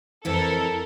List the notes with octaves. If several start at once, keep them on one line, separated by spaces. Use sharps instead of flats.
F2 E3 E4 A4 A#4